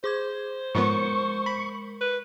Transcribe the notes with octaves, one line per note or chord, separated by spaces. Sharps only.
G#4 C5 D6 G#6
G#2 F3 G#3 B3 A#4 C#6
B5
B4